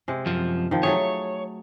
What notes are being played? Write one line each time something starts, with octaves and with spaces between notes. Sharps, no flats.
C3 G#3
F#2 F3
D#3 F3
F#3 A3 G#4 C#5